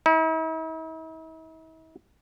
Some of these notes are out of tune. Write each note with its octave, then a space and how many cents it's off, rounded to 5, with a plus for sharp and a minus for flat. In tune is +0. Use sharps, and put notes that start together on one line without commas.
E4 -45